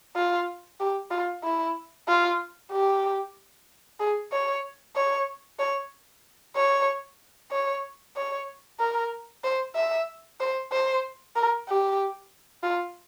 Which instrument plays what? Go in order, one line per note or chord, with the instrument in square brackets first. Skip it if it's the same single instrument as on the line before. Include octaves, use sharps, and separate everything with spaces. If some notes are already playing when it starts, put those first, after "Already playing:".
[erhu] F4
G4
F4
E4
F4
G4
G#4
C#5
C#5
C#5
C#5
C#5
C#5
A#4
C5
E5
C5
C5
A#4
G4
F4